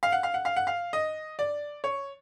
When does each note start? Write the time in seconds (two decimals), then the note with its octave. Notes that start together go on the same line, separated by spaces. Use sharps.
0.03 F5
0.12 F#5
0.23 F5
0.34 F#5
0.45 F5
0.56 F#5
0.67 F5
0.93 D#5
1.39 D5
1.84 C#5